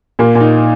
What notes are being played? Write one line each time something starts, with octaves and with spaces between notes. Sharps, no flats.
A#2 A#3
A#2
D#4